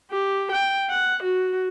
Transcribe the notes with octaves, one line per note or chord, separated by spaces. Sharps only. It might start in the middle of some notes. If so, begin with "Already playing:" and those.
G4
G5
F#5
F#4